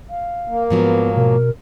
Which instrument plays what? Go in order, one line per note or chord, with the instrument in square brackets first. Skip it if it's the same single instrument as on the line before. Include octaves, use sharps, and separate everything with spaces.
[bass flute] F5
[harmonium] A#3
[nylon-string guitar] G#2 F3 F#3 [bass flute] B3
[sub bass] B2 [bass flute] A#4